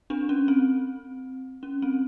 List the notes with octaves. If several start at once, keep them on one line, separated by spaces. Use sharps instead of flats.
C4 D4
C#4
C4
C#4
C4